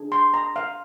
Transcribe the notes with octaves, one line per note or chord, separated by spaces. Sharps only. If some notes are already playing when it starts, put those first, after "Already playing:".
Already playing: D4 G#4
C6
A#5
F5